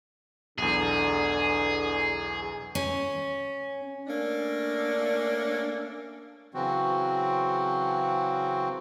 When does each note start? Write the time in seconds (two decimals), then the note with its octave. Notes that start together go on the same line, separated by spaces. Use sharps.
0.58 B1 E2 D3 G#4
2.75 C#4
4.07 A3 A#3 C#4 D4
6.54 C#3 E3 F#3 C4 F#4